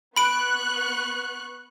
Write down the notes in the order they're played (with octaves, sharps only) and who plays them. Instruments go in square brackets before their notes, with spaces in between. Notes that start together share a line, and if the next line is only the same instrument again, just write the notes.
[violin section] B3 C#6 F#6 [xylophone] B5 D7